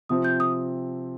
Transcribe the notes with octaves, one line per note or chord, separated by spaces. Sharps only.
C3 F3 C4 D#6
G6
D#6